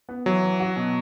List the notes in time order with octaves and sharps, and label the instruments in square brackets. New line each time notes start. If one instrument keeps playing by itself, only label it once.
[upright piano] B3
[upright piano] E3 [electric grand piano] F#3
[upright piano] E3
F#4
B2